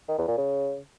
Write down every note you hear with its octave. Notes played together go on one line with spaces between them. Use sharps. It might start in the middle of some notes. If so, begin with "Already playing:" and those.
D#3
E2
A#2
C#3